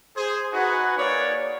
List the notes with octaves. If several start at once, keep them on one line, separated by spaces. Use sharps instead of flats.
G#4 C5
D#4 F#4 B4 F#5 G#5
A#3 D#4 C#5 D5